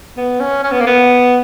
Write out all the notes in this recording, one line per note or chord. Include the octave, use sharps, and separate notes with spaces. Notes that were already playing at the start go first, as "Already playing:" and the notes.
B3
C#4
C#4
B3
A#3
B3